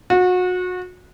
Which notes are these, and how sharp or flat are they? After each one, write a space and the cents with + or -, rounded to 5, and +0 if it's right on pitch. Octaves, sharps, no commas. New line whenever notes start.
F#4 -30